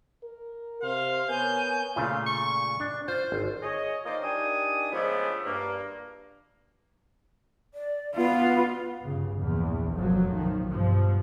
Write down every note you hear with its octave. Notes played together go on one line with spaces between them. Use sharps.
A#4
C3 C5 F5
B3 A#4 C#5 G#5 G6
A#2 C#3 A3 F4
C#6
D4
F4 C5
G#1
G#4 C#5 D#5
D#3 A#3 F4 C5 D5 D#5
D#3 D4 G4 G#5 D#6
C#3 F3 G#3 A3 B3 D4
G2 A#3
D5
B3 F4
G2 C#3
A#1 E2
F1 F#2 F3 F#3
B1 D#3 F3
G2 B2 F3